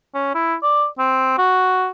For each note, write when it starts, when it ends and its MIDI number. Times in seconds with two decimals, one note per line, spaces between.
0.15 0.34 61
0.34 0.54 64
0.63 0.85 74
0.98 1.37 60
1.38 1.88 66